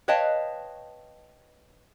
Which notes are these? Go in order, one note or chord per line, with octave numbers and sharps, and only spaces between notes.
B4 C#5 D#5 F5 G5 A5